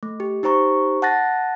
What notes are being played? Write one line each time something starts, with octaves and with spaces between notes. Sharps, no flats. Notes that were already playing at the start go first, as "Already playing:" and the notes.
A3
G4
D#4 G4 C5 A#5 C#6
F#5 A5 F#6 A6 A#6